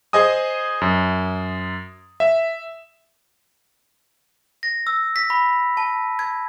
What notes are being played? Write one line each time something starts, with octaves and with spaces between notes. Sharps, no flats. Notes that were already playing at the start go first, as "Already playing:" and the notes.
G#4 C5 D#5 G#5 D#6
F#2
E5
A#6
E6
B6
B5
A5
G#6